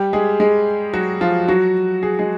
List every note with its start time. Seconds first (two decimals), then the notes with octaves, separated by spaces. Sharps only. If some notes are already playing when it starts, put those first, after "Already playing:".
Already playing: G3 G4
0.13 G#3 G#4
0.40 G#3 G#4
0.94 F#3 F#4
1.21 F3 F4
1.48 F#3 F#4
2.03 G#4
2.19 G#3 G#4